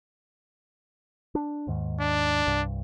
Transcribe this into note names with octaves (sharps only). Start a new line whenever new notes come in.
D4
D#2 G#2 D#3
D4
C2 G2